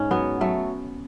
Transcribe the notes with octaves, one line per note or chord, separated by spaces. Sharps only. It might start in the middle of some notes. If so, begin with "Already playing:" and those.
Already playing: G#2 C#4
F#3 B3
F#3 A3